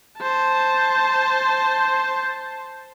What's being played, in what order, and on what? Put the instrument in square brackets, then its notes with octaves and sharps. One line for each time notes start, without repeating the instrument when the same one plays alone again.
[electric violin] C5 A5